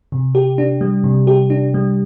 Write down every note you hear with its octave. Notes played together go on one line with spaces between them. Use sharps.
C3
G4
D4
G3
C3
G4
D4
G3